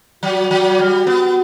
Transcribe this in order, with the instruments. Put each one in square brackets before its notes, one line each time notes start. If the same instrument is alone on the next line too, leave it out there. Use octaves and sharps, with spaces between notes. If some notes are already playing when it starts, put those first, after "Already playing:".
[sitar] F#3 [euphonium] F#4
[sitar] F#3
G3
B3